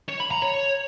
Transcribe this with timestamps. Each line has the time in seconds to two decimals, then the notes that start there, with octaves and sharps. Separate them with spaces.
0.09 C#5
0.20 B5
0.31 A#5
0.42 C#5